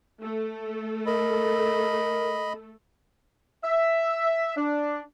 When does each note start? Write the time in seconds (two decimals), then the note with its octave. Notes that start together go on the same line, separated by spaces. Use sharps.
0.20 A3 A4
1.06 A#4 D#5 B5
3.63 E5
4.56 D4